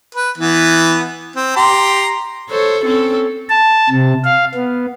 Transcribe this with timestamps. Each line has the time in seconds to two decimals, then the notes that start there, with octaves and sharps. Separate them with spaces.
0.15 B4
0.38 E3 B3
1.36 C4
1.56 G4 A#5 C6
2.50 A4 C5 C#5
2.85 C4 C#4 A4
3.49 A5
3.90 C3
4.24 F5
4.55 B3